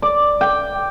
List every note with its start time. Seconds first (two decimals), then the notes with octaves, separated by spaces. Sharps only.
0.02 D5
0.41 G5